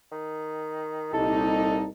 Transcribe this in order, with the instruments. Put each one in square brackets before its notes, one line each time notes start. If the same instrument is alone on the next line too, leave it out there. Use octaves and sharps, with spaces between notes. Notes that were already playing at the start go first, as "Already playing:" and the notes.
[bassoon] D#3
[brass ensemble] C2 A#2 D#4 [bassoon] A4